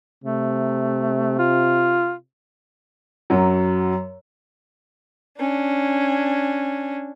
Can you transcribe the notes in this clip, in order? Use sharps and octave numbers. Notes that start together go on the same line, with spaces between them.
C3 A3
F4
F#2 F#3
C#4 D4